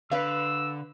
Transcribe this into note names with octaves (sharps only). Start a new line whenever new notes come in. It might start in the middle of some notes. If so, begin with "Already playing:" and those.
D3 B4 F5 E6